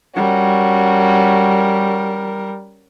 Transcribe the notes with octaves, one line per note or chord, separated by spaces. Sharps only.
G3 C#4 F#4 A#4